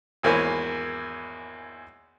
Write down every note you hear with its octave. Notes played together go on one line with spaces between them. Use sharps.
G#1 E2 A#3 C#5 G#5